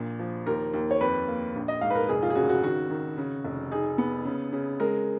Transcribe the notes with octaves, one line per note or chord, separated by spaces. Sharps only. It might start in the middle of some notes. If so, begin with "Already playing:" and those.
Already playing: A#1 A#2
F3
D#2 A#4
D#2
C#5
F2 B4
A#3
A#1
D#5
G#2 F5
B4
A#4
F1 G#4
F4
G#4
C#3 F#4
F#4
D#3 F#4
D#3
C#3
F1
D#4 G#4
B3
C#3
C#3
G#3 A#4